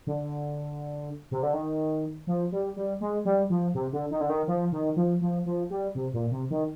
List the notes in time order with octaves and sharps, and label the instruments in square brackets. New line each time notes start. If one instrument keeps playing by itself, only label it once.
[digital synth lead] D3
C3
D3
D#3
F3
G3
G3
G#3
G3
F3
C3
D3
D#3
D3
D#3
F3
D#3
F3
F3
F3
G3
C3
A#2
C3
D#3